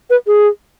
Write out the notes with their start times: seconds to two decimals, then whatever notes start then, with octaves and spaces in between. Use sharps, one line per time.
0.10 B4
0.27 G#4